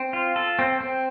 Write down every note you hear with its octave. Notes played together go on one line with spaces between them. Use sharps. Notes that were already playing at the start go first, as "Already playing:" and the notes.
Already playing: C4
F4
A4
C4
C4